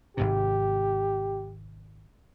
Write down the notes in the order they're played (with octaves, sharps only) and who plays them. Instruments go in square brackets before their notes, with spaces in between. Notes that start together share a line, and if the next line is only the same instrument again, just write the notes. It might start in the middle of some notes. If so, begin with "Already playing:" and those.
[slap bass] G#1 G#2 C3 [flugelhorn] G4